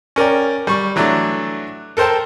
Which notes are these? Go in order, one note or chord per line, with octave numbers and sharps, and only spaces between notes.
C#4 A#4 D5 G5
G3 C#6
E3 F#3 A3 D4
A4 A#4 C5 G5 A5